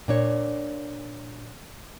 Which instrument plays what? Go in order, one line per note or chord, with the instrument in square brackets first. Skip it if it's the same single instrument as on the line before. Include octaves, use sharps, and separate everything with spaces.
[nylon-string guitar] A#2 D4 C#5